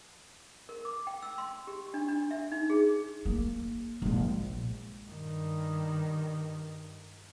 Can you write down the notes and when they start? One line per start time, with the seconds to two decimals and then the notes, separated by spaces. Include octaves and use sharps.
0.69 A#4
0.85 D6
1.07 G5
1.23 E6
1.38 C6
1.67 G4
1.94 D4
2.08 D4
2.31 E5
2.52 D#4
2.70 G#4
3.25 A#3
4.02 A#1 G#3
5.06 G2 D#3